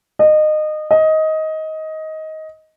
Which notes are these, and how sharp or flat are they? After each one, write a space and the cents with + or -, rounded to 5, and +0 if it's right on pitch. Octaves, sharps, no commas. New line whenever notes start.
D#5 -25
D#5 +15